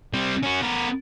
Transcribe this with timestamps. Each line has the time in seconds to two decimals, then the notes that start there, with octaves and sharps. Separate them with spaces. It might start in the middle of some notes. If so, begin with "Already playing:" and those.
0.14 G3 C4
0.43 C#4 F#4
0.63 B3 A#4